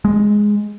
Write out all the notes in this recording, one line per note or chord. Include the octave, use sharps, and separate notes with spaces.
G#3